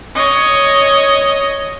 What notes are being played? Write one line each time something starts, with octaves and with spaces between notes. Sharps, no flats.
C#5 D#5